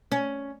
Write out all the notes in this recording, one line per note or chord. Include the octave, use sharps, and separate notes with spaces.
C#4